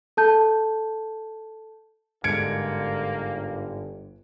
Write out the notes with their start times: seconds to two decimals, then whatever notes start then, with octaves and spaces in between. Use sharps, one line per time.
0.17 A4 A5 G6
2.24 G1 G#2 D3 A#3 G#6 C#7 D7